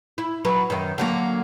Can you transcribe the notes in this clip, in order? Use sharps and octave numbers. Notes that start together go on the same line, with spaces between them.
E4
F#3 B4
F#2 D#3
D3 F#3 A#3